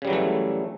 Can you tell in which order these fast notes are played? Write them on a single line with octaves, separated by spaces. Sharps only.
C#3 G3 F#3 E3 A3